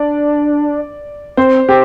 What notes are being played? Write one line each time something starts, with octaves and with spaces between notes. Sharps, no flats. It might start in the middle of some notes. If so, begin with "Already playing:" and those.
Already playing: D4 D5
C4 C5
C4 G4